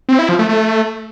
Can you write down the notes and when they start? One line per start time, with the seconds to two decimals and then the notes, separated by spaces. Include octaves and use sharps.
0.09 C4
0.19 E4
0.29 F3
0.39 A3
0.49 A3